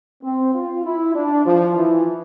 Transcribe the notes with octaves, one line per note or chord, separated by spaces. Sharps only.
C4
F4
E4
D4
F3
E3